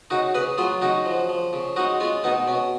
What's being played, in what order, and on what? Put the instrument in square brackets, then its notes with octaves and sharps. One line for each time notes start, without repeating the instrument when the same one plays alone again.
[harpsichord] C#3 D#4 F#4
C#3 G#4 B4
F#3 F4 G#4
C#3 D#4 F#4
F3
F3
C#3
G#3 D#4 F#4
G#3 C#4 F4
B2 B3 D#4
B2 C#4